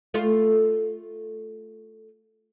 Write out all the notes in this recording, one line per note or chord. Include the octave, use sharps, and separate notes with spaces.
A3 F4